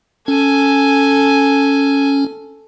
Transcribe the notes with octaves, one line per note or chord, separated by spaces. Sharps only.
C#4 A4 G#5